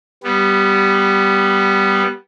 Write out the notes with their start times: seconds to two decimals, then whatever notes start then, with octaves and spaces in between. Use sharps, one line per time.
0.23 G3 B3